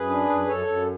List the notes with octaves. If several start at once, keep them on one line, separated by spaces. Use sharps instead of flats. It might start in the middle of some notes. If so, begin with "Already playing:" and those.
Already playing: F#2 G#4 B4
D4
F#2
F#2 A4 C#5
F#2